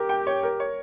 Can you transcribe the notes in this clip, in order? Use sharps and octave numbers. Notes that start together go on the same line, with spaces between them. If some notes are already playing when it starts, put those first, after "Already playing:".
Already playing: G4 A#4
G5
C#5
A#4
C#5